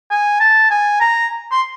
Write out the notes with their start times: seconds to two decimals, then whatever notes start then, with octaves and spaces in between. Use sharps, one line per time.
0.11 G#5
0.40 A5
0.70 G#5
1.00 A#5
1.51 C6